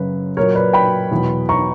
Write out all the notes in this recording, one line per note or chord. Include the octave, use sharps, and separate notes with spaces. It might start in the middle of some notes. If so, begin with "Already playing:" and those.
Already playing: F#2 C#3 F#3 B4
A#2 F#3 A#4 C#5
B4 D5
G5 B5
E2 B2 F#3
A#5 C#6